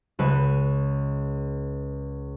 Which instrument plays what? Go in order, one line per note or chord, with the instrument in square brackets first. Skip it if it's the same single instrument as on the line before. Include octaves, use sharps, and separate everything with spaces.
[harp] C#2 B4 B6